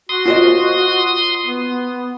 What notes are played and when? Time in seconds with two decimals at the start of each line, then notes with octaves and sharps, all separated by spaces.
0.09 F#4 C6 D#6
0.26 F4 C5 D#5
1.45 B3